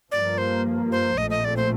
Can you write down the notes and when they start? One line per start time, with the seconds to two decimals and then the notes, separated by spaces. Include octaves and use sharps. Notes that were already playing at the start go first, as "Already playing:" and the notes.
0.11 G2 F3 A#3 D5
0.38 C5
0.92 C5
1.18 A#1 A#2 A3 C4 D#5
1.30 D#5
1.45 D5
1.57 C5